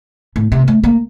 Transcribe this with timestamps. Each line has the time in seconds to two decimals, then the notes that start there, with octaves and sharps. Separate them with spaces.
0.36 A2
0.52 C3
0.68 A3
0.84 A#3